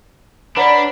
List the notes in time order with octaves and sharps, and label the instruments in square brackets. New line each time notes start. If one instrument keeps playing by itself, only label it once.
[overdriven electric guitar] D4 [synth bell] B4 D5 [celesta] C#5 F#5 A#5 [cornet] B5